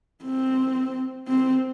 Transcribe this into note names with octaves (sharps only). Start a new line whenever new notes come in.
C4
C4